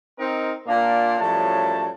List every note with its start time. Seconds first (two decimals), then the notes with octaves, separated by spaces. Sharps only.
0.19 C4 D#4 A#4
0.67 A#2 A#3 D4
1.19 F#2 A2 F3 G3 A5